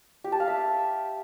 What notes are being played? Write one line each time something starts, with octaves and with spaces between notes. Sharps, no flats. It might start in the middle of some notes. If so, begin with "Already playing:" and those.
G4
A5
F5
E5